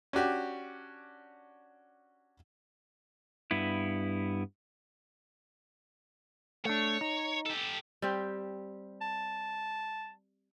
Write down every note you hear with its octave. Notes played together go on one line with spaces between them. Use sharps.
C#4 D4 F#4 G4
G2 B3 E4
A3 D4 C#5
D#4
G4 A4
G3 C4 G4
A5